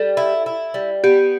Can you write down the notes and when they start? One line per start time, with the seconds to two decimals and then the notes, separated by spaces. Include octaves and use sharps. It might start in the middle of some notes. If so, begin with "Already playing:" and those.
Already playing: G3 A4
0.17 E4
0.46 E4
0.74 G3
1.04 B3 G4